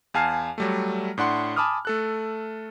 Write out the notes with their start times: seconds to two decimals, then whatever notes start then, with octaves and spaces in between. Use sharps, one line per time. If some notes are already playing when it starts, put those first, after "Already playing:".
0.14 E2 F5 G#5 A5 F6 C7
0.58 F#3 G3 A3
1.18 A2 D4 F#5 C6
1.56 G#5 A5 B5 D6 D#6 F6
1.85 A3 A4 F#6